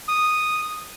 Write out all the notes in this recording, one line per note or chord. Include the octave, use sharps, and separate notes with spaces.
D#6